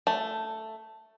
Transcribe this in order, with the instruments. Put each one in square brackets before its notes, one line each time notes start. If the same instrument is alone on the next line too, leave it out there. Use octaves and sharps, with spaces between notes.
[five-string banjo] A3